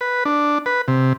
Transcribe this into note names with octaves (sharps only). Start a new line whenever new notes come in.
B4
D4
B4
C3